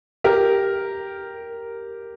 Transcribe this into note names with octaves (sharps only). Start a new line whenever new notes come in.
G4 A#4